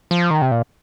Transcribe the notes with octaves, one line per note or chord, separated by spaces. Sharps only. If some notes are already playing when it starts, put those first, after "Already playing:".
F3
D#3
C3
A#2